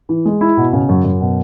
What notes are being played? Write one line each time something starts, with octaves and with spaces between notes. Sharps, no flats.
E3
G#3
E4
B2
C#3
F#2
F#2
B2